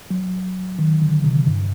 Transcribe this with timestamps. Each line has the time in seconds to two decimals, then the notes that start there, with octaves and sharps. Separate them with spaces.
0.10 F#3
0.79 D#3
1.02 D3
1.24 C3
1.47 G2